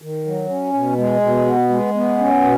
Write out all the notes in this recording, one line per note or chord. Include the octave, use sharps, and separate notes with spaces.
D#3
F#3
C#4
B2
G#3
B2
B3
G#3
B3
C#4
B2